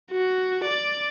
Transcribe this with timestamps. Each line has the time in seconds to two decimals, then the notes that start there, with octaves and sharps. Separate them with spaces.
0.12 F#4
0.64 D5